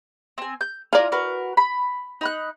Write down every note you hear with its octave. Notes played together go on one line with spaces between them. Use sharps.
C4 G#5
G6
E4 F4 D5 G#5 A#5
F#4 A#4 B4
B5
D#4 B5 F#6